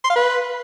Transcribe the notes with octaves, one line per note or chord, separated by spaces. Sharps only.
C6
F5
B4